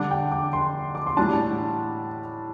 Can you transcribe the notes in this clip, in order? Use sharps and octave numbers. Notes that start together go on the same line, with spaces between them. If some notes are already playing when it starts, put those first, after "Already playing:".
Already playing: D3 G3 D4 D6
G5
D6
C6
D6
C6
A2 G3 D4 A5